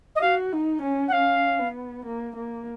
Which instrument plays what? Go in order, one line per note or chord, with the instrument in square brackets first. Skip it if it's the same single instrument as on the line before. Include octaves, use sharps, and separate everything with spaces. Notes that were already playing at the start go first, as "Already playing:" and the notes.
[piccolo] D#5
[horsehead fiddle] F#4 [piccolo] F5
[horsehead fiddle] D#4
C#4
[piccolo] F#5
[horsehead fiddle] C#4 [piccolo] F5
[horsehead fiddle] B3
A#3
A#3